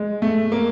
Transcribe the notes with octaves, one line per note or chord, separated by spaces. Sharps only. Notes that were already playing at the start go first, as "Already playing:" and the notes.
Already playing: G#3
A3
A#3